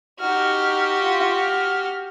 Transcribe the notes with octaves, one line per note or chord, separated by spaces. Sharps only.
D#4 F#4 G4 F6
F4
F6